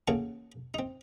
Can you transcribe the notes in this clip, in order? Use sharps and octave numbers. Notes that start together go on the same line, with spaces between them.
A1 C#3 A#3 F#4 A5 C#6
C4 D#4